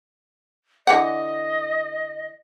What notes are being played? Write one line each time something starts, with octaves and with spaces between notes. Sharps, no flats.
D3 E3 D#5 F#5